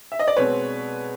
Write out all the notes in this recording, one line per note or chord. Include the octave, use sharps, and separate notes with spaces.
E5
D#5
D5
B2 G#3 C4 B4 C#5